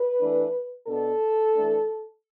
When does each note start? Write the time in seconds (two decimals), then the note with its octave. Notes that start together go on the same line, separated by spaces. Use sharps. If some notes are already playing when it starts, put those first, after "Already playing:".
Already playing: B4
0.21 E3 A3 D4
0.87 B2 B3 D4 A4
1.54 E3 A3 D4